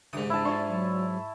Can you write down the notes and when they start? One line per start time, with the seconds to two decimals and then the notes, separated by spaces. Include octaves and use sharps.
0.13 G#2 C#3 G3 G4 D#6
0.30 E4 A5
0.45 D4 E4 F4 C#6
0.68 F#3